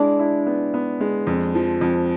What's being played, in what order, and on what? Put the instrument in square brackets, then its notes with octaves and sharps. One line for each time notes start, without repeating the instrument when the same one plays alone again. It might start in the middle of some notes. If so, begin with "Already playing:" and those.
Already playing: [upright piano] G#3 E4 [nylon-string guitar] D4
[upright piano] E4
B3
B3
G#3
F2
F3
F2